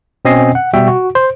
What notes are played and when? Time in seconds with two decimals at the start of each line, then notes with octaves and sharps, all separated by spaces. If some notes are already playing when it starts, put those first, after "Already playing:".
0.25 B2 C4 C#4 D#5 G#5 C7
0.55 F#5
0.73 B2 G3 F#4 E5 G5
0.88 F#4
1.15 C5